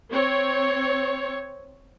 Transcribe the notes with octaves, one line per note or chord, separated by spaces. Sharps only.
C4 C#5